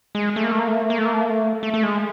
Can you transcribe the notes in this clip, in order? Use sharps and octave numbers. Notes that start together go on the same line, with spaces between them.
G#3
A3
A#3
A3
A#3
A3
A#3
A3
A#3
A3
A#3
A3
A#3
A3
A3
A3
G#3